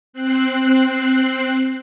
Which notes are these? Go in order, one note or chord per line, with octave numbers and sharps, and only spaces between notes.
C4 F#6 C7